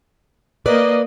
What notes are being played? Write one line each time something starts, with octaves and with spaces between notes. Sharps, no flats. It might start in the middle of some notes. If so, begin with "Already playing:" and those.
A#3 B4 D5 D#5